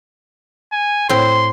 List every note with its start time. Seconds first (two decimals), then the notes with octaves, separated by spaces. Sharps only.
0.73 G#5
1.09 A2 C4 C6